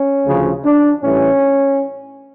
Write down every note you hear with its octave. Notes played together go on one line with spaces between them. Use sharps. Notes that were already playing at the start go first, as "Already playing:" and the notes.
Already playing: C#4
D2 C#3 F3
D4
A2 E3 G3 C#4